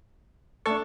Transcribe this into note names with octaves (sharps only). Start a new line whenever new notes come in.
A3 D4 A4 C#6